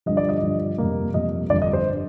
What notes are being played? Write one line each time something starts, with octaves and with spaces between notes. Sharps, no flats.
G2 D3 F3 D#5
D5
D#5
G2 D3 F3
F2 C3 G3 A#3
F2 C3 G3 A#3 D#5
G1 F2 D3 D5
D#5
C5
D3